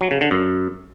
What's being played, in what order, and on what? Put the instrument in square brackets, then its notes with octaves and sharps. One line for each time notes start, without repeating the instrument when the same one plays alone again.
[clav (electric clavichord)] F#3
C#3
D3
F#2